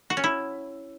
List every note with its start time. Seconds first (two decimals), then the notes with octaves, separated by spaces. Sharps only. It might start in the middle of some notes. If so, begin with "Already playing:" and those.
0.10 F#4
0.17 C#4
0.24 E4